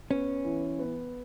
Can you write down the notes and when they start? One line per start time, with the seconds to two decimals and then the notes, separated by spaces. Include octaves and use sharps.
0.10 B3 C#4
0.44 E3
0.79 B3